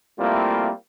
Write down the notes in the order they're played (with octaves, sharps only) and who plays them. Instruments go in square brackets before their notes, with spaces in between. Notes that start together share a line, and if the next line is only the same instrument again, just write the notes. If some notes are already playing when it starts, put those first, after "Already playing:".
[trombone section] G3 A3 A#3 C4 E4 F4